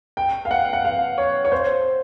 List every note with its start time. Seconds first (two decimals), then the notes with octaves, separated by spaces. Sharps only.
0.17 G5
0.45 F5
0.51 F#5
0.73 F#5
0.85 F5
1.18 C#5
1.45 C#5
1.52 C5